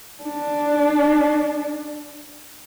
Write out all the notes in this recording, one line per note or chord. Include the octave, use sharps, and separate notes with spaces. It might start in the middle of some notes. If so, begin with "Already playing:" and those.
D4